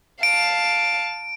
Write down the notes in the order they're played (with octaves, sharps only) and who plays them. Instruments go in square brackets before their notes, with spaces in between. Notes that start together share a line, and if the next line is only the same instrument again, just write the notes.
[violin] F5 A5 [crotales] D7